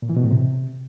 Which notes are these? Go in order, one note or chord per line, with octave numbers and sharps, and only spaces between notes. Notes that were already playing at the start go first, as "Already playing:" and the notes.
A#2
E3
B2
A2
C3